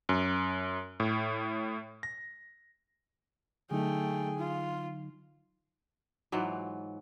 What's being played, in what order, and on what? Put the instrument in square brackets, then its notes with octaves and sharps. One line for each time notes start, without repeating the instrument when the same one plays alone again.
[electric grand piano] F#2
A2
A#6
[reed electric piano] D3 F#3 D#4 [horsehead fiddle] A3 G5 [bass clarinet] G#4
[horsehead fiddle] F4
[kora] G#2 E3 F#3 F4